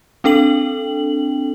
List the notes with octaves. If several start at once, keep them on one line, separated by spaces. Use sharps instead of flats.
C4 D4 A4 G5 F#7